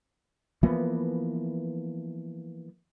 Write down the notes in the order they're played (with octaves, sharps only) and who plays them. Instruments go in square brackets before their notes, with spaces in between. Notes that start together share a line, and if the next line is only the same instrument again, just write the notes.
[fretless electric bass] E3 F3 A#3 B3